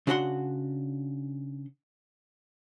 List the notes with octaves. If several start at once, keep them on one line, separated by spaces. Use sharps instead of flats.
C#3 D4 F#4 G#4 F#5 C6